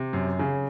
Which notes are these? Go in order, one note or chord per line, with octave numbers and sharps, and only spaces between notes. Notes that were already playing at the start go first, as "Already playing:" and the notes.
Already playing: C3
F#2
C#3